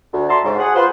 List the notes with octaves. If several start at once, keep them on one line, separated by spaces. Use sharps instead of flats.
D2
D5 E5 F#5 A5 A#5 C6
G#2 C#3
G#4 F#5
F4 B4 C5